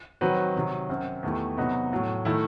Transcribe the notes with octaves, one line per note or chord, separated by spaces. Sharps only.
D#3 F#3 C4 F#4 B4
C3 D#3 F#3
F#2 F#3 C4
E2 D#3 A3 E4 G4
C3 F#3 B3 D#4 F#4
A2 F#3 A3
D#3 A3 E4 A4